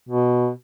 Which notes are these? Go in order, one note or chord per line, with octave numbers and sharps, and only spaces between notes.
B2